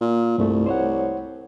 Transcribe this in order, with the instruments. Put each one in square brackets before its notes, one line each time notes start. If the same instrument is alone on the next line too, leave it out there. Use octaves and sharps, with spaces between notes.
[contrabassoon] A#2
[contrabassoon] C2 [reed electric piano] G2 A3
[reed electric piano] C5 C#5 F#5